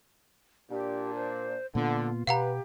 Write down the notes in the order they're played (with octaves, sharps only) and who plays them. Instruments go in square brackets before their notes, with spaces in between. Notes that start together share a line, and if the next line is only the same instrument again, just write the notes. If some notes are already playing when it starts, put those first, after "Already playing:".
[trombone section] A#2 D4 [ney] G4
[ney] C5
[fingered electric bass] A#2 A#3 B3 [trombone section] D3 [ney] F4
[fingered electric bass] B2 [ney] G4 [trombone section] B4 [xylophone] F5 F#5 A#5